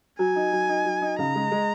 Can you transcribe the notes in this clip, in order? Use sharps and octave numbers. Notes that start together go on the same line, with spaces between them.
F#3 G#5
D#4
F#3
D#4
F#3
D#4
C#3 A#5
G#3
G#3